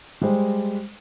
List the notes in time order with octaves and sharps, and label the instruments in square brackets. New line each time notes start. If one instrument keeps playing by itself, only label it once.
[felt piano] G3 G#3 C5